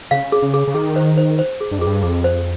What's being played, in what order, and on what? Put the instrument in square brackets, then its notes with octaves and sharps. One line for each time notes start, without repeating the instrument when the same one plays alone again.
[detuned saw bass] C#3 [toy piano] F5
[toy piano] G#4
[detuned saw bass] C#3
[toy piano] G#4
[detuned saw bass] C#3
[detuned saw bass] D#3 [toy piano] G#4
[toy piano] C5
C5
C5
G#4
[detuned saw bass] G2
F2
[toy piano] G#4
[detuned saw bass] G2
[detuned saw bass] F2 [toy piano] G#4
[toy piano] C5